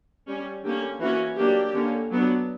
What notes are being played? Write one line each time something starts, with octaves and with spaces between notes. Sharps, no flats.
G3 C#4
D3 A#3 C#4 G4
E3 A#3 C#4 F#4
F#3 A#3 D4 G4
D3 A#3 C#4
F#3 B3 D4